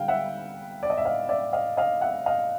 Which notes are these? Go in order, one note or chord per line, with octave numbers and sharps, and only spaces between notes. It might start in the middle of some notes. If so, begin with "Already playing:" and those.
Already playing: D3 G3 F5 G5
E5 F#5
D5
D#5
E5
D#5 F5
D5 E5
D#5 F5
D#5 F5
E5 F#5
D#5 F5